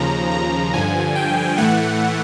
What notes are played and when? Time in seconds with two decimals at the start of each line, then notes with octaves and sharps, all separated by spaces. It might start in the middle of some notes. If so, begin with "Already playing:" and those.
Already playing: D#2 C#3 F3 A#5
0.31 A#5
0.73 G2 D3 F3 G#5
1.15 G5
1.58 A2 E3 A3 F#5